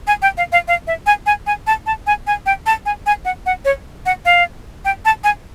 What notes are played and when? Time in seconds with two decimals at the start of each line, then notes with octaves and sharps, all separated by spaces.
0.07 G#5
0.22 G5
0.37 F5
0.52 F5
0.68 F5
0.87 E5
1.06 G#5
1.26 G#5
1.47 G#5
1.67 A5
1.86 A5
2.07 G#5
2.27 G#5
2.46 G5
2.66 A5
2.86 G#5
3.06 G#5
3.25 F#5
3.46 F#5
3.65 C#5
4.06 F#5
4.25 F5
4.85 G5
5.05 A5
5.24 G#5